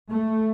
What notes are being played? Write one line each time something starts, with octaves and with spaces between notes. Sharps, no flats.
A3